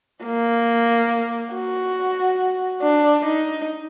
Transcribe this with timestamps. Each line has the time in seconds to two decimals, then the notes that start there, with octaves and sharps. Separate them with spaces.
0.24 A#3
1.53 F#4
2.82 D4
3.26 D#4